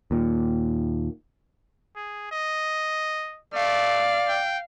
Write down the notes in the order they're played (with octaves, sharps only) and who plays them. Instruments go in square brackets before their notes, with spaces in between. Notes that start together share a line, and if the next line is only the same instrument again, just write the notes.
[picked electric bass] D#2 A#2
[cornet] G#4
D#5
[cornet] A3 [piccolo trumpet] D5 [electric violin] F5
[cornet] G5